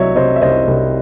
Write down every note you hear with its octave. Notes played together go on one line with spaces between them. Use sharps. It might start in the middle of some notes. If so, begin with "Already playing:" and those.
Already playing: C2 F#3 C#5 D#5 E5
C3 C5 D#5
E5
C2 C5 D#5
C2